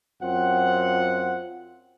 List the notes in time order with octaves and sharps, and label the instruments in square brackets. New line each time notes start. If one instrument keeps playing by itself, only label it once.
[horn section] F#2 C4 F4 F#5